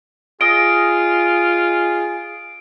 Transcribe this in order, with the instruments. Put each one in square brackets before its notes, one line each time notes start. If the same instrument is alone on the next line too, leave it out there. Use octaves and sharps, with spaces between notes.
[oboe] F4 [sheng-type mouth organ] G#4 [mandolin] D#5 [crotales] D7